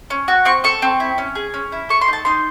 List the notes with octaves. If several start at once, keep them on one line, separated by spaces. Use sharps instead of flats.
C#4
F#4
C4 C#6
A4 C#6
C4
E4
C#4
G#4
C#4
E4
A4 C#6
C6
D#4 A5
D#4 C6